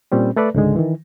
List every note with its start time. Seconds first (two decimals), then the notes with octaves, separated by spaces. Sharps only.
0.12 A#2 G3 C4 C#4
0.36 A3 A4 B4 D5
0.54 C#2 G#2 D3 G#3
0.76 D#3 E3